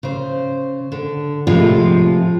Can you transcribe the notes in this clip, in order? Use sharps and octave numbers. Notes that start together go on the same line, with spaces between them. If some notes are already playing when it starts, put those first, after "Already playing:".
C#3 C5
D3
A2 C3 F3 G#3 F4